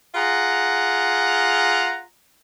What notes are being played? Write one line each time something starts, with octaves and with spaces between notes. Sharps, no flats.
F4 G#4 F#5 A#5